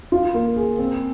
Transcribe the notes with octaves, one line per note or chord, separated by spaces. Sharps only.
F4
A#3
G#4
C4